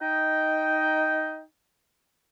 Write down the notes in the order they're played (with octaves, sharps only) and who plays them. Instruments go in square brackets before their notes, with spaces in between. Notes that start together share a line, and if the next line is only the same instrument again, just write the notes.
[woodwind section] D#4 D#5 G5